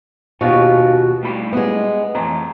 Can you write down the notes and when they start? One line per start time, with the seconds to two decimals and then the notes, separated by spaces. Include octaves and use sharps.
0.41 D#2 B2 D#3 F4 F#4
1.23 A2 G3 B5
1.53 G#3 B3
2.15 F2 A2 E3 A#5